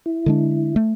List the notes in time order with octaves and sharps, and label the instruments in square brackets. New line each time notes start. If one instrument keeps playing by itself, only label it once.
[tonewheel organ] E4
[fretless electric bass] D3 G#3 D4
A3